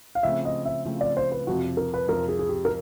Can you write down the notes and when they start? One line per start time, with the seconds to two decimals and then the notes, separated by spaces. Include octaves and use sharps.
0.15 F5
0.23 C#3 F3 A3 C4 E5
0.45 D#5
0.65 E5
0.85 C#3 F3 A3 C4
1.01 D5
1.17 C5
1.32 B4
1.47 F2 C3 F3 F#4
1.77 A#4
1.94 B4
2.08 F2 C3 F3 A#4
2.29 G#4
2.39 G#4
2.49 G4
2.65 A#4